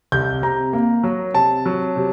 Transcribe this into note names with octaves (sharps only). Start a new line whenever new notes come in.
C2 G6
C3 A#5
A#3
F#3
C3 A5
F#3
C3